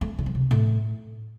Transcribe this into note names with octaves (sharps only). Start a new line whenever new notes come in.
A3
D3
F3
C3
A2